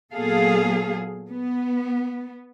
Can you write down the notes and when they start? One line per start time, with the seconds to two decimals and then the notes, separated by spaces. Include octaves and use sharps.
0.14 A#2 F#3 B3 G#4 A4 F5
1.31 B3